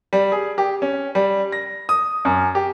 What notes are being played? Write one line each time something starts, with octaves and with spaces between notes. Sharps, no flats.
G3
G#4
G4
C#4
G3
A#6
D#6
F#2
G4